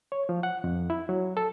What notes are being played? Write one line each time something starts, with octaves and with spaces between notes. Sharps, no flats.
C#5
F3
F#5
F2
E4
F#3
A4